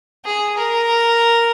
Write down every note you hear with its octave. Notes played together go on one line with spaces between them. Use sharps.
G#4
A#4